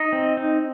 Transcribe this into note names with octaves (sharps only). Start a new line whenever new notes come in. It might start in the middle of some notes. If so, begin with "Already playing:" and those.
Already playing: D#4 D#5
C4
D#4